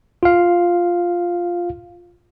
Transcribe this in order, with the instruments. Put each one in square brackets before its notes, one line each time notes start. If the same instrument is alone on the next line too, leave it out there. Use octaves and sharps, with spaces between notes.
[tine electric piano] F4 F5